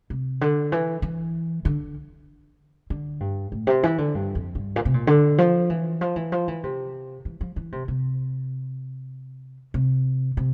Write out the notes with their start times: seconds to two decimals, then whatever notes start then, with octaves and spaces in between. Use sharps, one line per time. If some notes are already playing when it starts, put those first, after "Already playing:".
0.10 C3
0.41 D3
0.72 E3
1.02 E3
1.65 D3
2.90 D3
3.20 G2
3.52 A2
3.67 C3
3.83 E3
3.98 D3
4.15 G2
4.35 F2
4.55 G2
4.76 A#2
4.85 C3
4.94 A#2
5.07 D3
5.38 F3
5.70 E3
6.01 F3
6.16 E3
6.32 F3
6.48 E3
6.63 C3
7.25 E3
7.41 F3
7.56 E3
7.72 C3
7.88 C3
9.74 C3
10.37 C3